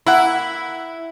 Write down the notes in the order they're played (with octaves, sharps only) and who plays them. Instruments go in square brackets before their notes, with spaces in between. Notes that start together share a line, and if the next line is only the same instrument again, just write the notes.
[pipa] A#3 G4 F#5 [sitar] E4